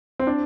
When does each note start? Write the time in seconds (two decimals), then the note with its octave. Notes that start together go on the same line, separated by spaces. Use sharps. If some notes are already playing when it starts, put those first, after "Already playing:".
0.19 C4
0.27 D4